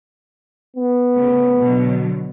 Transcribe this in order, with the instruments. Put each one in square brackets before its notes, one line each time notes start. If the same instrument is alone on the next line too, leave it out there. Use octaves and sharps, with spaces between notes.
[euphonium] B3
[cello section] C#3 A3
B2 D3 F#3